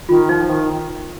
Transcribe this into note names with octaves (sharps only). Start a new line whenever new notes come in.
D#3 F4
F3 D#4
D#3